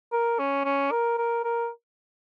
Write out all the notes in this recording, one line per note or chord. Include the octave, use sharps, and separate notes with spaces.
A#4
C#4
C#4
A#4
A#4
A#4